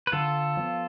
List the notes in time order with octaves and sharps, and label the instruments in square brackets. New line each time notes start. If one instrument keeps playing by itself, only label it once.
[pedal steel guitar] B4
[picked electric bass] D3 [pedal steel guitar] F4 A4
[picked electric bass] F3 B3